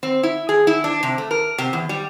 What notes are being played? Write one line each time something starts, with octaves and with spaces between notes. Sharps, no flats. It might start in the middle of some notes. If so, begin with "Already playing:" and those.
C4
E4
G#4
E4
D4
C3
A3
A#4
C3
E2
G3